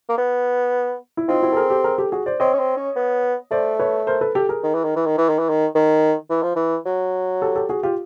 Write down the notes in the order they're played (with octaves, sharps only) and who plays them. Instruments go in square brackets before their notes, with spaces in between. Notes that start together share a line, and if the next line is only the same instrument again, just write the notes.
[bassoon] A#3
B3
[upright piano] E4
[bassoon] C4 [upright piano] D#4 F4
[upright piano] E4 F#4
A4
G#4 A#4
G4 A4
G#4 A#4
G4 A4
F#4 G#4
C5 D5
[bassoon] C4 [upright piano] C#5 D#5
[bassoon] C#4
C4
C#4
B3
[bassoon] A3 [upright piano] C5 D5
[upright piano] B4 C#5
A#4 C5
A4 B4
G4 A4
G#4 A#4
[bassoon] D#3
E3
D#3
E3
D#3
E3
D#3
E3
D#3
D#3
E3
F3
E3
F#3
[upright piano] G4 A4
G4 A4
F#4 G#4
F4 G4